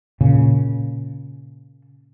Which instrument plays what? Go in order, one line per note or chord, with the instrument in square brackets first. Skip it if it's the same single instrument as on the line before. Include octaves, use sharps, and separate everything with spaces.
[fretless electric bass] A#2 C#3